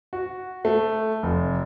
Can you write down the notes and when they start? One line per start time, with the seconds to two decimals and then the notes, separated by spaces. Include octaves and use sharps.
0.13 F#4
0.65 A3
1.23 F1